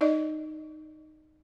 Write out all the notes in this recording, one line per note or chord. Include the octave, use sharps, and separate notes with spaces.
D#4 D5 D#5